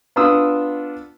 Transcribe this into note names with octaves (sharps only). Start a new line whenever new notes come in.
B3 D4 F4 D#6 E6